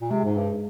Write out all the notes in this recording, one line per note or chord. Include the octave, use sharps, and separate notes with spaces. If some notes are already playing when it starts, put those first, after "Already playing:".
A#2
C3 G#3
G#2
G2